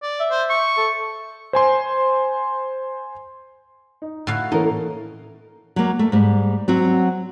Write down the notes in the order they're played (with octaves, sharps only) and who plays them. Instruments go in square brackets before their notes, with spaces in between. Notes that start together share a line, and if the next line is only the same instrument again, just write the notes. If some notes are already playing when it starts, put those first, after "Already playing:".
[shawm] D5
[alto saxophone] E5
[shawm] C5
C#6
[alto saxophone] A4
[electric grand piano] C5 G#5 C6
[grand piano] D#4
[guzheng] A2 F#4 F5
[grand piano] E3 A#3 C#4 [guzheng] D#4 [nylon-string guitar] A4 A#4
[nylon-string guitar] F#3 A#3
A3
G#2 G3
F#3 C4 F#4